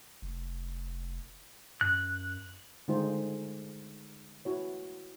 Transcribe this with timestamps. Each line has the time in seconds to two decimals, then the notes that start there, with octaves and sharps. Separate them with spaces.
0.22 F1
1.81 F#2 F#6
2.88 D3 G#3 D#4 F4 C5
4.45 E4 F#4 C#5